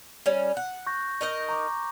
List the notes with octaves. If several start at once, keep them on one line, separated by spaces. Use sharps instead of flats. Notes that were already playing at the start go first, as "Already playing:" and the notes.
G3 C#4
F#5
C#6 G6 A#6
D#4 A#4 D#5
A#5 C#6 D6